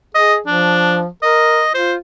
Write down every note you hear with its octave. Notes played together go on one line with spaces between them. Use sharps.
G#4 D#5
F3 D4
A#4 D#5
F4 C5